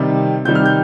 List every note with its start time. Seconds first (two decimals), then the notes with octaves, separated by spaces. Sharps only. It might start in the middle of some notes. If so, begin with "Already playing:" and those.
Already playing: C3 D#3 G3
0.45 C3 D#3 G3 G6
0.55 F6
0.66 G6